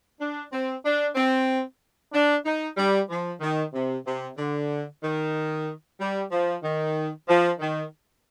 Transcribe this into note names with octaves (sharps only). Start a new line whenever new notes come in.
D4
C4
D4
C4
D4
D#4
G3
F3
D#3
C3
C3
D3
D#3
G3
F3
D#3
F3
D#3